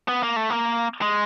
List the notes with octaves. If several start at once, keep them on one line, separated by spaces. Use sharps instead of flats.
B3
A#3
A3
A#3
G#3